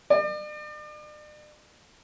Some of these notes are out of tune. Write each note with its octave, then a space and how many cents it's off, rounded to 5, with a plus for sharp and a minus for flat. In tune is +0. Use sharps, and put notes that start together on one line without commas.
D5 +40